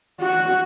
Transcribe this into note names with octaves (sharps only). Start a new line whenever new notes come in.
F#4